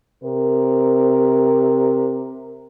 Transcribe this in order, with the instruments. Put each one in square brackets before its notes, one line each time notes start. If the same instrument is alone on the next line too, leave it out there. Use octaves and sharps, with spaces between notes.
[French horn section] C3 A#4